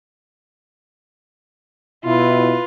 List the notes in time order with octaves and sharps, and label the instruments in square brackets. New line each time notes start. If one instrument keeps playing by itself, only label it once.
[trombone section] B2 E4 [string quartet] F4 B4